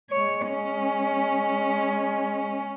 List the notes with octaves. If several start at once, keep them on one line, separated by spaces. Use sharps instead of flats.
G#3 C#5
C#4